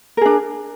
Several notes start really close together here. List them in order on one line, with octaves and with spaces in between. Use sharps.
A#4 G#4 D4